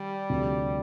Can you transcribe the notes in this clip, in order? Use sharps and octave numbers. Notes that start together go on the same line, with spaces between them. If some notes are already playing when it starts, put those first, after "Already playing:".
Already playing: D#3 G3
D2 C3 F3